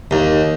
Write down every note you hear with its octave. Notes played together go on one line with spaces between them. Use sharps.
D#2